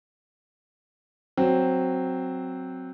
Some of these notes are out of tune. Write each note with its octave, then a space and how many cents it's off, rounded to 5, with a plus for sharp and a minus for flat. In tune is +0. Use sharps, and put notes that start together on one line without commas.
F#3 +0 C4 +0 C5 +0